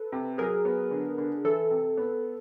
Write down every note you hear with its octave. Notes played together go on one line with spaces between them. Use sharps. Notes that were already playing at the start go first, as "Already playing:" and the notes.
Already playing: A4 B4
C3
F#3 G#4 A#4
B3
D3
D3
E3 A4
C3
B3